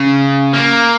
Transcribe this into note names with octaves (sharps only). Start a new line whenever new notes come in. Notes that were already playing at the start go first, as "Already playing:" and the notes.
Already playing: C#3
A#3